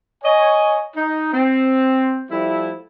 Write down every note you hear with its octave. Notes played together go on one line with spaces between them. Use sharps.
C#5 D#5 G#5
D#4
C4
F3 G3 A3 E4